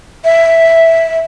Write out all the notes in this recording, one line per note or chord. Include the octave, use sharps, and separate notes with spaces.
E5